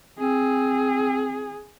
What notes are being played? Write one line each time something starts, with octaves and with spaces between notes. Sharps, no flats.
C4 G#4